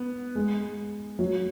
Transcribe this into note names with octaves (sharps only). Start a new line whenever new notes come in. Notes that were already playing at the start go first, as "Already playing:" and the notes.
Already playing: B3
G#3
F#3